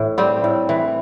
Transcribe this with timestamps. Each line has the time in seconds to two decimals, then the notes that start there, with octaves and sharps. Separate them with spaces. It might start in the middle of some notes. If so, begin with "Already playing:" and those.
Already playing: A2 E3
0.18 G3 C4
0.44 A2
0.69 E3